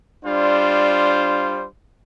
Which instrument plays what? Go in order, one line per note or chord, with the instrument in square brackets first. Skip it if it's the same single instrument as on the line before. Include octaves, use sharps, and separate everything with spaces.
[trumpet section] G3 F4 C5 [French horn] D4